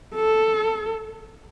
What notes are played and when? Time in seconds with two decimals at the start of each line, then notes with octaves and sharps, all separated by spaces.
0.15 A4